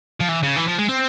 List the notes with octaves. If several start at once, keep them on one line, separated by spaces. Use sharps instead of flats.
F3
E3
C#3
E3
F3
G#3
C4